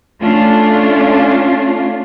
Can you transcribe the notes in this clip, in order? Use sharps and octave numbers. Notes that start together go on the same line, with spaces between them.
A3 C#4 D4 F4